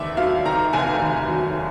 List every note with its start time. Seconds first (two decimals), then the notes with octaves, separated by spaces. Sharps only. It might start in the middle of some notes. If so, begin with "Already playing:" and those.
Already playing: F1 D#2 D#3 D5 E5
0.17 F#3 F5
0.45 D#3 A#5
0.73 F1 G#5
1.01 D#2
1.28 F#3